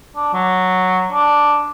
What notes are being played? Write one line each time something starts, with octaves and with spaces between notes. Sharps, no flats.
D4
F#3
D4